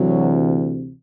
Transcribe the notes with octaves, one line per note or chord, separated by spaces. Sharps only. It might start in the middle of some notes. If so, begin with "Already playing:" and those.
Already playing: D2 C3 E3 F#3